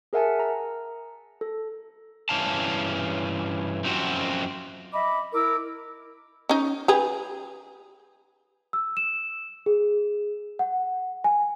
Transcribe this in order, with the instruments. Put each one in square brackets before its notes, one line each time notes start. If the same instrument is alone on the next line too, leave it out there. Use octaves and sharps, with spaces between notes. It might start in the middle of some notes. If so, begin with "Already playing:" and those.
[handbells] G#4 A#4 E5 F#5 G#5 A5
A#5
A4
[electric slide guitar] G2 E3 C#4 F5 A5
F#2 F3 C4 D4 F#4
[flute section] D#5 E5 B5 D6
E4 A#4 D6 E6
[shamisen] C#4 D#4
G4 G#4 B4
[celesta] E6
E7
G#4
F#5
G#5